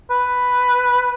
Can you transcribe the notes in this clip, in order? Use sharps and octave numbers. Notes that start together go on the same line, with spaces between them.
B4